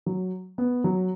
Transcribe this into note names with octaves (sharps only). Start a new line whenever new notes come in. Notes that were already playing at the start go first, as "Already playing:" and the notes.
F#3
B3
F#3